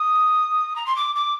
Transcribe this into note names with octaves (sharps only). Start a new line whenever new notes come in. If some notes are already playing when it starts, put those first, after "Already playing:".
Already playing: D#6
A#5
C6
D6
D6